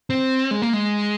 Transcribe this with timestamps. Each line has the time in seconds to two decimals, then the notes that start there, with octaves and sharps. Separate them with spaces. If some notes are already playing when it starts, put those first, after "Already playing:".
0.10 C4
0.51 G#3
0.62 A#3
0.73 G#3